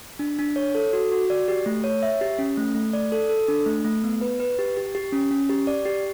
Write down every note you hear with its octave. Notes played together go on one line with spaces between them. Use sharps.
D4
D4
C#5
A4
F#4
F#4
D5
G4
A3
C#5
E5
G4
C#4
A3
A3
D5
A4
A4
D4
A3
A3
B3
B4
B4
G4
G4
G4
C#4
C#4
G4
D5
G4